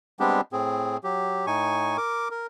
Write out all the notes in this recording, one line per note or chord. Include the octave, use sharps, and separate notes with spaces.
G3 G#3 B3 C4 D4 G4
A2 C4 G#4
F#3 G4
A2 D#4 G#5 C#6
A#4 D6
A#4